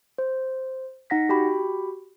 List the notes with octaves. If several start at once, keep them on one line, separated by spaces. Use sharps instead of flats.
C5
D#4 F#5 A#6 B6
F#4 G4 G5 B5